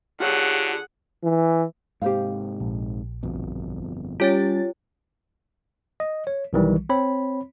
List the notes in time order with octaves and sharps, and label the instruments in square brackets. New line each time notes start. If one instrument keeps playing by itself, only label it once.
[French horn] D3 [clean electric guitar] F4 G4 C#5 [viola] G#4 F#5
[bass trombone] E3
[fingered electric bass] G#2 C3 [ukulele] G4 C5 F5
[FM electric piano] A#1
[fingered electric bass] G1 F2 B2
[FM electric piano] G3 C#4 A6 [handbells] F4 C#5 [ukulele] G4
[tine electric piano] D#5
C#5
B1 D#3 E3 G3
C4 C#5 B5